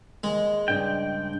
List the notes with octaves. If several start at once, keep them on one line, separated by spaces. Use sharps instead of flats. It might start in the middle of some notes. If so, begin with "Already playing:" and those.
D#2 G#3
G2 C#3 D4 G5